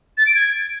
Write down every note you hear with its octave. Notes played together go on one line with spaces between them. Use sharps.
A6
D7
G#6